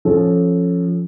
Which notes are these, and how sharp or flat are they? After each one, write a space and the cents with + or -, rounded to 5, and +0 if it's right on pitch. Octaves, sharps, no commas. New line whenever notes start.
F3 +0 C#4 -15 A4 -15